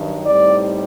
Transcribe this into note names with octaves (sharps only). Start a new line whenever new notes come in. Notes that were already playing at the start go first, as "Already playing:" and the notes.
Already playing: G2 D#3 F#3
A2 G3 C4 D#4 D5